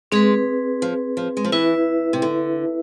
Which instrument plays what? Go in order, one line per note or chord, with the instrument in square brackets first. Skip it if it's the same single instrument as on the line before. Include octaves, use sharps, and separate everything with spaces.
[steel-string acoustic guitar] G#3 [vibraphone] C4 G#4 B4
[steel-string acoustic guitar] F3
F3
G#3
F3
[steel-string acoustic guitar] E3 [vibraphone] E4 B4 E5
[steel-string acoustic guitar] C3
D3